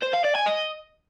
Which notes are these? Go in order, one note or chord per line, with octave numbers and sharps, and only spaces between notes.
C5
F5
D5
G#5
D#5